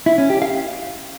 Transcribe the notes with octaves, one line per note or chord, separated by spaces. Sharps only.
E4
C#4
G4
F5